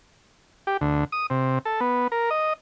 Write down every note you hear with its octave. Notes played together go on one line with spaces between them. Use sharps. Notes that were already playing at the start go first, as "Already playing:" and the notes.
G4
D2
D#6
C3
A4
B3
A#4
D#5